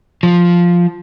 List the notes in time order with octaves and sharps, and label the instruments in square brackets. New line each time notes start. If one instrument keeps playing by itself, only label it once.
[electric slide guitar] F3